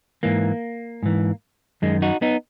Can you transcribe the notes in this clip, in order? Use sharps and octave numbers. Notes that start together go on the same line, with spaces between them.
G#2 E3 A#3
G#2 E3
F#2 D#3 G#3
D#4 F#4
B3 D#4